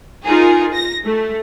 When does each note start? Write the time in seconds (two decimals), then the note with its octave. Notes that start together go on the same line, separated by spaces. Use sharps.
0.25 D#4 F4 G#4 A#4
0.72 A#6
1.05 A3